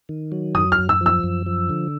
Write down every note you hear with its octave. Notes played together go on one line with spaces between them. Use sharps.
D#3
F#3
F#2 D#6
F6
F#2
E6
F3
E6
F#2
F3
D3